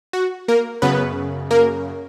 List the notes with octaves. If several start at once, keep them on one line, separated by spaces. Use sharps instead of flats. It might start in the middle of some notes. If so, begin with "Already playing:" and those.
F#4
A#3 A#4
F#2 C#3 B3 B4
A#3 A#4